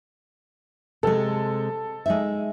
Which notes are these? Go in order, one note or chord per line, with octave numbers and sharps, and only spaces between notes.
C3 G#3 A4
G#3 D#4 E5